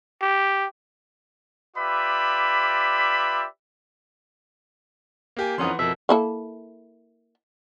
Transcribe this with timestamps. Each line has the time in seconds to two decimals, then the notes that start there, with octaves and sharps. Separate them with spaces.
0.21 G4
1.77 F4 G4 B4 D5 E5 B5
5.37 A#3 G4 G#5
5.58 F2 E3 C#4 D#4 F#5 C6
5.79 F2 B2 A#4 E5
6.09 A#3 E4 A4